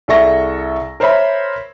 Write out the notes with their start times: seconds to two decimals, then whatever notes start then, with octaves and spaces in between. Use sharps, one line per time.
0.08 C2 G#4 A4 E5 C#6 A#6
1.00 A#4 C5 C#5 E5 B5